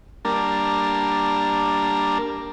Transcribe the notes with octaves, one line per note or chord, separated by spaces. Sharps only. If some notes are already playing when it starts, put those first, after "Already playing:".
G3 A#3 D4 A#4 A5